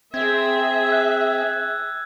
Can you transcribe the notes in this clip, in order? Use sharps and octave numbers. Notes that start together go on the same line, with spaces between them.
C4 G#4 E5 G#6
E6 F#6